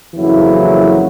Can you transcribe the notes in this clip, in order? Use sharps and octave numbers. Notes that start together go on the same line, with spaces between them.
F2 C#3 E3 F#3 A#3 E4